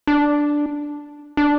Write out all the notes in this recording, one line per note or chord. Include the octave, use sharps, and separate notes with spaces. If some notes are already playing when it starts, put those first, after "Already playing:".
D4
D4